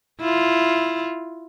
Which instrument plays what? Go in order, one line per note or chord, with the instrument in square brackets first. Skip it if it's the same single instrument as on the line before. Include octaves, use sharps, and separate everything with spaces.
[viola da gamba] E4 F4